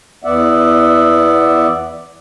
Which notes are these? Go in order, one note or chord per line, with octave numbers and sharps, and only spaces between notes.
E2 B3 D5 E5 F#5